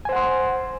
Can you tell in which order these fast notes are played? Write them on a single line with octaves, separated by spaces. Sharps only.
G#5 C5 F#5 C6